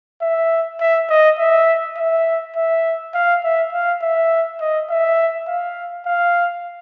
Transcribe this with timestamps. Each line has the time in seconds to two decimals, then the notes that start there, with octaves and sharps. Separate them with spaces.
0.22 E5
0.80 E5
1.10 D#5
1.39 E5
1.97 E5
2.56 E5
3.14 F5
3.44 E5
3.73 F5
4.02 E5
4.61 D#5
4.90 E5
5.48 F5
6.06 F5